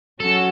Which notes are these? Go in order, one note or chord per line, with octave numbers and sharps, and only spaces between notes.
F#3 C#4 F#4 A4